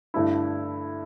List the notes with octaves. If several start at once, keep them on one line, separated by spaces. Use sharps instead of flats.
G2 D3 A3 D4 E4